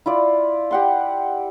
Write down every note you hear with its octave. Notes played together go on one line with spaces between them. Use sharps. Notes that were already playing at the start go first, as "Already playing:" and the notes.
E4 F4 D5
G4 F#5 C6